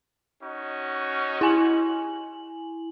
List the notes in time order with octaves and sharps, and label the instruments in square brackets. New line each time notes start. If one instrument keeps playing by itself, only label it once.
[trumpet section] C#4 D#4 F#4
[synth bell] E4 G#5 F#7